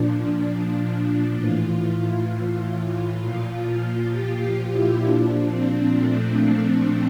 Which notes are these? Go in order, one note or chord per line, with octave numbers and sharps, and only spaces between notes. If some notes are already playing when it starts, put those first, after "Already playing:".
Already playing: A#2 F3 D4
A2 E3 F4
F4
A#2 F3
G4
F4
E4
A#2 F3 D4
C4
A3